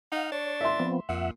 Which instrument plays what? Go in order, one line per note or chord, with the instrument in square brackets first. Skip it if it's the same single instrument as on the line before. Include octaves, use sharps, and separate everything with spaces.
[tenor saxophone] D#4 [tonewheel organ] F5 F#5
[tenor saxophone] D4 [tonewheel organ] C#5
[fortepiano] E5 C6
[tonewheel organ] F3 B3 C4
[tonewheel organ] F2 E5 F#5 [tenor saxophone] A#2